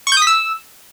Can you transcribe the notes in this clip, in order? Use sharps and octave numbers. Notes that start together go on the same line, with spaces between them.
C#6
G6
D#6
B6
E6